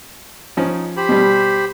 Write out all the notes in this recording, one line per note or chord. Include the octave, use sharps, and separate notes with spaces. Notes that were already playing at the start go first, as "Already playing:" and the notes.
F3 C#4 D#4
G4 C5 B5
B2 G3